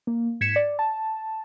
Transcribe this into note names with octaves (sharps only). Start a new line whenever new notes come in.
A#3
G#2 G#6 B6 C#7 E7
D5
A5